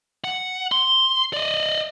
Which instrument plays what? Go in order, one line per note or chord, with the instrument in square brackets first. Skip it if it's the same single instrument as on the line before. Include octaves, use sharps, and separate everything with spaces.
[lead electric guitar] F#5
C6
D5 D#5